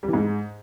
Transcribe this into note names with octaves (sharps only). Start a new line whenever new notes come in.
G3
E3
G#2